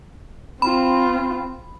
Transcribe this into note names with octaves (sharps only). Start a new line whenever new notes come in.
C4 F4 B5